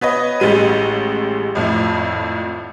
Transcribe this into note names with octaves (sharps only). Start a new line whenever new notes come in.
B3 B4 C#5 D#5
A1 G3 G#3 D#7
G#1 F2 A2 E4